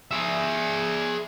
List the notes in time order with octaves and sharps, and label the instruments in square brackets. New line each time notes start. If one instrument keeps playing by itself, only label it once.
[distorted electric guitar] G#4 E5